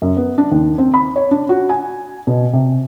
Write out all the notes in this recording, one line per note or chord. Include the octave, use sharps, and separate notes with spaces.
F#2
B3
D4
D#2
C4
B5
C#5
D4
F#4
G#5
B2
C3